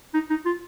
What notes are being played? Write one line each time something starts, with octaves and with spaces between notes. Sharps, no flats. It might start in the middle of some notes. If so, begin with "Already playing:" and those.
D#4
D#4
F4